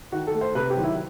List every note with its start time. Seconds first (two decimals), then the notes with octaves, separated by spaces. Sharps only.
0.12 D#3 F#4
0.27 A4
0.34 A3
0.41 C5
0.55 C3 B4
0.70 G4
0.77 D#3 F#3
0.84 E4